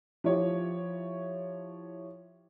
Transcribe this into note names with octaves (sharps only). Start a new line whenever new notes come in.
F3 E4 G4 C#5